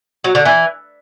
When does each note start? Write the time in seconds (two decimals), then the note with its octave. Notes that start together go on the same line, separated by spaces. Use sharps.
0.24 F#3
0.35 D3
0.45 E3